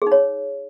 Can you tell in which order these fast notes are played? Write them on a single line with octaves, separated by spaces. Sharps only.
G#4 D#4 C#5